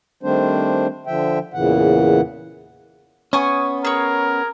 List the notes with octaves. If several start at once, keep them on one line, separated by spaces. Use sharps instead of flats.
D#3 G3 A3 C4 D4 C5
D3 F3 E5 G5
E2 A#2 C#3 E3 F#5
B3 C#4 G#5 C#6 D#6
G#4 A#4 C#5